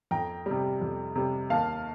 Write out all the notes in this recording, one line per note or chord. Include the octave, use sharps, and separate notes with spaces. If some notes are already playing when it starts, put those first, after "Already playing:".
F2 G5 A#5
C3 G3
F2
C3 G3
D#2 F5 A5